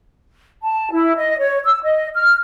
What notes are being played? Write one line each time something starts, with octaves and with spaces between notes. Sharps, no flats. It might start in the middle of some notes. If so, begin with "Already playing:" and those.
A5
E4
D#5
C#5
E6
D#5
F6